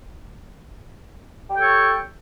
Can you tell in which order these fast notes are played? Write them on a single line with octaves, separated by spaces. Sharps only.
G4 G5 A4 C#5